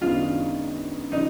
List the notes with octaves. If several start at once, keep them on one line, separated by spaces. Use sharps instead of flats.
F#2 D#3 G#3 B3 D4 F4 F5
C#3 F3 D#4 D#5